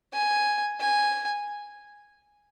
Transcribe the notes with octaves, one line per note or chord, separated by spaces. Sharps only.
G#5
G#5